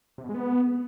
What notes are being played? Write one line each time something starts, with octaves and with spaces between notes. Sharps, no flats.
C3
B2
G#3
B3